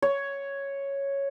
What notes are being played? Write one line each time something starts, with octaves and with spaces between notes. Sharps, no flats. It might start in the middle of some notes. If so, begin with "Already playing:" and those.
C#5